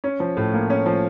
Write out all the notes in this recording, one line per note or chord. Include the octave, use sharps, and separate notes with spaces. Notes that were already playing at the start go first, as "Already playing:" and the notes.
C#4
F3
A2
A#3
C#4
F3